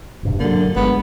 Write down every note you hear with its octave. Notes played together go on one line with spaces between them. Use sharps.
E1 G2 C3
D3 F#3 A#3
G1 G#3 B3